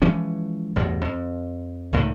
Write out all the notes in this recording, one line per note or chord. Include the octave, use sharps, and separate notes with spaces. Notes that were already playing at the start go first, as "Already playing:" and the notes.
E3 F3 G#3 C#4
A1 E2 G2 B2
F2
C#2 A2 D3 D#3